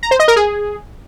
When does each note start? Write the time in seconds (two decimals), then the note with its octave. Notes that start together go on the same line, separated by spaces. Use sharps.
0.03 A#5
0.11 C5
0.20 D#5
0.28 A#4
0.36 G#4